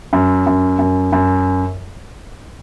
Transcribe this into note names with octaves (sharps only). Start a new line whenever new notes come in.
F#2
F#2
F#2
F#2